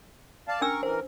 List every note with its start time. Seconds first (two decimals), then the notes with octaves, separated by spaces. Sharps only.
0.48 D5 F5 A5
0.61 C#4 D4 A#4 C#6 E6
0.83 E3 A#4 C5